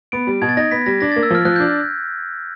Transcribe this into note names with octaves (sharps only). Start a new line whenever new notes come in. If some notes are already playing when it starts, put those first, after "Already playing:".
B3 D7
G3
B2 G#6
A6
D#4 A#6
B3 B6
G3 A#6
D4 A#6
A#3 A6
E6
F3 F6
F3 F#6
D4 G6